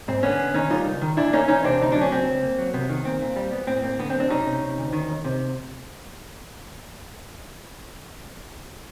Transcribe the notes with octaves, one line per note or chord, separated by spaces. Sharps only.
G#2 C4
D3 B3 C#4
D3
D#3 C#4 D#4
G3 D#4 F4
C#2
D#3
A#2 D4 E4
A#3 C#4 D#4
E2 C#4 D#4
C3 C4 D4
D2 D#4
F#3 D4
C#4
C#2 C4
C#2
A#3
F#3
C3 B3
D#3
A#2 C4
A#2
G3
B3
A2 C4
A#3 C4
D3 B3
C4
F#2
C4 D4
C3 C#4 D#4
C3
C3
D2
D#3
D#2
C3